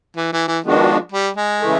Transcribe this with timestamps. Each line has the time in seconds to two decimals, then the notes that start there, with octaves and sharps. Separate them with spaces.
0.17 E3
0.33 E3
0.48 E3
0.64 D#3 F3 G#3 B3 D4 F#4
1.12 G3
1.37 G#3
1.60 C#3 E3 A3